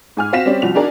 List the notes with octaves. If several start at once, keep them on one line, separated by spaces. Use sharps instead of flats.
G#2 G#5 F6
C4 F#4 F5 A#6 B6 E7
G3 C4 C#4 D5
C2 F3 F#4 F7
D4 D#4 F#4 G#4 A#4 D5